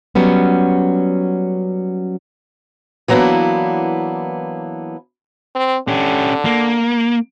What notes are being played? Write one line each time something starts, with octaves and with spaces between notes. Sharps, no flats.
F#3 G3 B3 C#4
E3 F#3 A#3 B3 D4 E4
C4
D3 C#4 G4
A#3